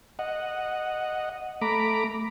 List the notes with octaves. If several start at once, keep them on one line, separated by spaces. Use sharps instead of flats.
D#5 F#5
A3 A#5 B5 D6